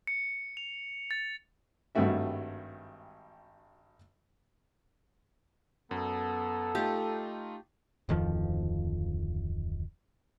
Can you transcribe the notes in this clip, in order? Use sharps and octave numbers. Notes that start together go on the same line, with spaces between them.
C#7
F7
A6
G#1 G2 G3 A3 F#4 E5
F#2 B3 A4
A3 D#4 F4 G4
D1 F2 D#3 F3